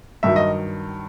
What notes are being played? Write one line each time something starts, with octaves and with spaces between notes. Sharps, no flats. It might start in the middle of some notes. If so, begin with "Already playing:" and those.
G2 D#3 F#3 E5
D#5